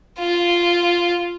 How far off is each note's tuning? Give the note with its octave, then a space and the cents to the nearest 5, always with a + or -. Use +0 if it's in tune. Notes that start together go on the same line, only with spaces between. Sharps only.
F4 -5